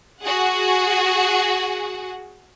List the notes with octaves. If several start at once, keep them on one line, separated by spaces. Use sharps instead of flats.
F#4 G#4 F#5